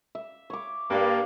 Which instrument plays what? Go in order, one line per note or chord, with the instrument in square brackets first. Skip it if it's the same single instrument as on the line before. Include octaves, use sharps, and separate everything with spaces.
[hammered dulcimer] E5
C#5 D6
[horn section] G2 A#3 [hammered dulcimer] B4 D5 F5